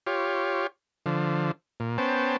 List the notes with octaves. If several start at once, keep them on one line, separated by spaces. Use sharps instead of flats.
F4 G4 C#5
D3 F3
A#2
B3 C#4 C5 G5 A5